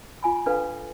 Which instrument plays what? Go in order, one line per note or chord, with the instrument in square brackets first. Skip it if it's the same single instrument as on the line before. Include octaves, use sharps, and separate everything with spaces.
[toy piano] F4 G#5 B5
D4 A4 B4 F5